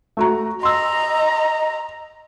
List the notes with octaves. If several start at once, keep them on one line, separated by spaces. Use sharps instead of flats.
A3 F#4 A#5
D#5 A#5 C6 E6